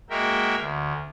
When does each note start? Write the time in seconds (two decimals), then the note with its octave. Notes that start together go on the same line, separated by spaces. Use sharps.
0.10 G#3 A#3 F#4 A#4 E5 G5
0.58 D2